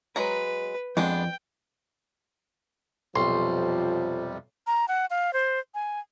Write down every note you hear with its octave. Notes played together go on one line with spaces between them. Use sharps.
F#3 G#3 B4 A#5
F2 G#3 B3 D4 G5
B1 F2 C3 F3 G3 C6
A#5
F#5
F5
C5
G#5